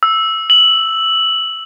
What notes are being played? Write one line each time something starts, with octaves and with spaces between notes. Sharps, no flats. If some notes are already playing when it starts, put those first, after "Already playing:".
E6
F#7